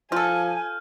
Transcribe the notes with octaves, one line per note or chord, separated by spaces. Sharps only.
F3 F4 A4 G#5 F6 G6